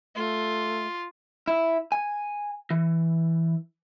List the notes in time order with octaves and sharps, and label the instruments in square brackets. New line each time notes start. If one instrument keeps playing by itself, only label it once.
[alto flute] A3 [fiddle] F4
[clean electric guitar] E4
G#5
E3